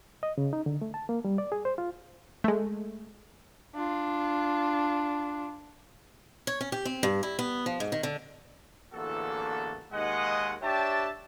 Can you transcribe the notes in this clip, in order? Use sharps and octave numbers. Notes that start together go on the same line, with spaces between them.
D#5
C#3
D#4
D3
A3
A5
A#3
G3
D5
G#4
C5
F4
G#3 A3
D4 F4
C#5
C#4
G4
C4
G2
E4
B3
F3
G#2
D#3
D3
A1 E2 D3 A#3 F#4 A4
D#2 G#3 D#5 F#5
D4 G4 C#5 E5 G5 A5